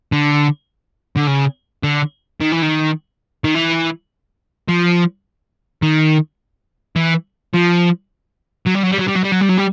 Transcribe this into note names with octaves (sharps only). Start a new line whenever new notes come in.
D3
D3
C#3
D3
D#3
E3
D#3
D#3
E3
F3
D#3
E3
F3
F#3
G3
F#3
G3
F#3
G3
F#3
G3
F#3
G3
F#3
G3